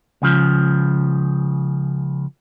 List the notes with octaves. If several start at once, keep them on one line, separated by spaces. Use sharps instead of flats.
C#2 C#3 F3